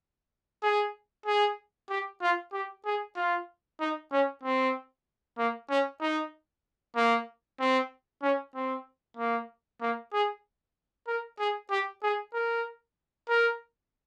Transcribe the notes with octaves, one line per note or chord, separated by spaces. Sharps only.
G#4
G#4
G4
F4
G4
G#4
F4
D#4
C#4
C4
A#3
C#4
D#4
A#3
C4
C#4
C4
A#3
A#3
G#4
A#4
G#4
G4
G#4
A#4
A#4